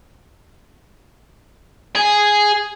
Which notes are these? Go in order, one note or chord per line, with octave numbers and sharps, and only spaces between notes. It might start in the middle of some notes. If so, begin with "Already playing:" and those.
G#4